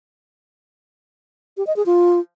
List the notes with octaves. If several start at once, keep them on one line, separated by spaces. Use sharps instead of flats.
G4
D#5
G#4
F4